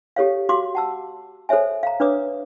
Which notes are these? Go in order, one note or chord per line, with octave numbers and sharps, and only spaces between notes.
G4 A4 C#5 F5
F#4 F5 C6 D6
F#5 A5 E6
A4 C5 C#5 E5 G#5
F5 A#5
D4 B4 C#5 D6 D#6